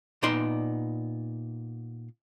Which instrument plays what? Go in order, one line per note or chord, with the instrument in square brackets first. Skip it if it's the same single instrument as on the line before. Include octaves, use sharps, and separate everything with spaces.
[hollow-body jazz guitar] A#2 B3 D#4 D5 C6